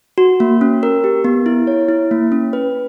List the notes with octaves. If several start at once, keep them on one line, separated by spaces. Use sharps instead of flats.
F#4
A#3
C#4
A#4
G4
B3
E4
C#5
E4
A#3
C#4
B4